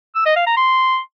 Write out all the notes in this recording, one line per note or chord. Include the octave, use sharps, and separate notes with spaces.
E6
D#5
F5
A#5
C6